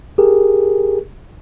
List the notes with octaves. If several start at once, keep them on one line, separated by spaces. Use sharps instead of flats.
G4 G#4 A#4